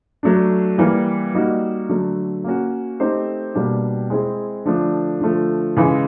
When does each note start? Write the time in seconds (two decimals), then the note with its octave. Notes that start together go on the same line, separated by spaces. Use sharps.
0.23 F#3 A3 D4
0.78 E3 G3 A#3
1.34 G3 A#3 D#4 F#4
1.89 D3 F#3 A3
2.44 A#3 C#4 F#4
3.00 A3 C4 D#4 G4 C5
3.55 B2 G3 A#3 D4 G4
4.10 G#3 C4 E4 G#4
4.65 D3 F3 A3 D4
5.21 D3 F3 A3
5.77 C#3 E3 G#3